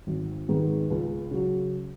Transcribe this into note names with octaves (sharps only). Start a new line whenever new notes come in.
G#1
G#2 D#3 G#3 B3
C#2
C#3 F#3